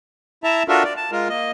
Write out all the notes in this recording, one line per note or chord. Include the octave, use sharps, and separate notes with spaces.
E4 E5 A5 A#5
D4 F4 F#4 A4 A#4 E5
D5
A5
G#3 F4 A#4
A#3 D#5